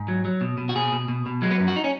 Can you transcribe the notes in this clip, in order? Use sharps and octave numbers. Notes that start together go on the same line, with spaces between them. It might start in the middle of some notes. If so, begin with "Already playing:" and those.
Already playing: G#2
F#3
F#3
B2
B2
F#4
B2 G#4
B2
B2
B2
F#3 G#3
B3
F#2
F#4
D#4
C#4